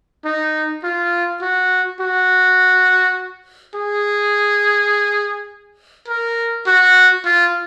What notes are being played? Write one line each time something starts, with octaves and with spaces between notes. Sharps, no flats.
D#4
F4
F#4
F#4
G#4
A#4
F#4
F4